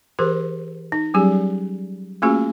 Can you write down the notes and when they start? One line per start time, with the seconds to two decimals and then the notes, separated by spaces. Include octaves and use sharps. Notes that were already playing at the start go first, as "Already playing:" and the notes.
0.19 E3 G4 G#4 A#4 C5
0.92 D#4
1.14 F#3 G3 C#4 G4 G#4
2.22 A3 A#3 C#4 F4 F#4 G#4